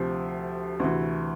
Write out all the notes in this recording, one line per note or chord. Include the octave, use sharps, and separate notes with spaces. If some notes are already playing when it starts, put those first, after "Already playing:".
Already playing: D2 C3 F3 C4
D2 C3 E3